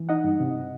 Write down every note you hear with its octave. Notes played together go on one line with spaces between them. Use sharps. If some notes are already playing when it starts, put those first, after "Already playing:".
Already playing: E3
D#4 D#5 F#5
G2
C3